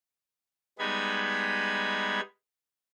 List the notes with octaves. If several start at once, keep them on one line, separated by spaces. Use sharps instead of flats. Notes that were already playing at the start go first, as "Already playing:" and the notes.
G3 G#3 B3 D#4 B5 G#6